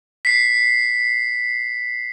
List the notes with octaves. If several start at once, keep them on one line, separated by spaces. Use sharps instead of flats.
B6 C7